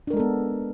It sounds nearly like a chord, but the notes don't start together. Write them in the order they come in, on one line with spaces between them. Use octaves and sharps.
D4 A#4 G#3 A4 B3